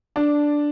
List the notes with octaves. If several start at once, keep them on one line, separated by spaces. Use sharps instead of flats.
D4